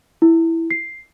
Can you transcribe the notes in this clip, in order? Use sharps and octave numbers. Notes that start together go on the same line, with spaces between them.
E4
C7